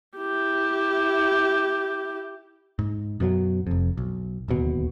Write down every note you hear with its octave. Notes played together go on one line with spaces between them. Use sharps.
E4 G4
G#2
F#2 B2 E3 F#3
F1 F2
B1
D1 D#2 B2